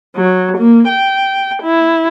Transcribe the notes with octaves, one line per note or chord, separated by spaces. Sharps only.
F#3
A#3
G5
E4